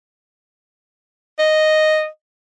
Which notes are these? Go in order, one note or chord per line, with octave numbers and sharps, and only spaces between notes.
D#5